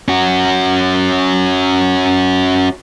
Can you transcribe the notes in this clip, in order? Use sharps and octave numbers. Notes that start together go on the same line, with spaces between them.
C#4 F#4